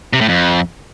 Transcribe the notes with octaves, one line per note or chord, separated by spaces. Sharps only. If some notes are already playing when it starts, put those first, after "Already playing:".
C3
A2
F2